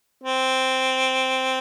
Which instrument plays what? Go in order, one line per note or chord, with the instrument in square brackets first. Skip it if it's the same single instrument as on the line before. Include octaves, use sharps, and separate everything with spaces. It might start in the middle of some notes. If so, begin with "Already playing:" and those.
[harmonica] C4